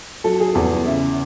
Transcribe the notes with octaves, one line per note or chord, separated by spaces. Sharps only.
F#3 A4
G#4
E2 A4
C#3 E5